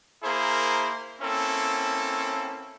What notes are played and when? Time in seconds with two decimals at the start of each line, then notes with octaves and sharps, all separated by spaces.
0.24 A#3 E4 G#4 A#4 C5
1.22 A#3 C4 C#4 E4 A4